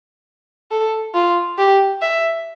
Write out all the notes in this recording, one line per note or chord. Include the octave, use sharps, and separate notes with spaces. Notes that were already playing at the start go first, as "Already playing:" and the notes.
A4
F4
G4
E5